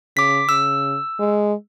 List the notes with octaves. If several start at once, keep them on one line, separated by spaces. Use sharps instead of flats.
C#3 D6 B6
C#3 E6
G#3